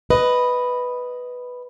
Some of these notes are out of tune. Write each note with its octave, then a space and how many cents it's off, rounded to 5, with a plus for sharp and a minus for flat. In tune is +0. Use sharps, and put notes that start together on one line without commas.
B4 +0 D#5 +0